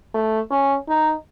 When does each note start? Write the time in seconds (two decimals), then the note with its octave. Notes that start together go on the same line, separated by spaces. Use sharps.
0.14 A3
0.51 C#4
0.88 D#4